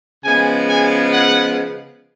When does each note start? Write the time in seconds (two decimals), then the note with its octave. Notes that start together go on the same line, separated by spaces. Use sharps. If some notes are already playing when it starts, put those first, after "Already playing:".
0.24 C#3 F3 G#3 B3 G#5
0.67 G#5
1.11 F#5